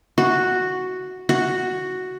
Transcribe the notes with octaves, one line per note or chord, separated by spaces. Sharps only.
F#4
F#4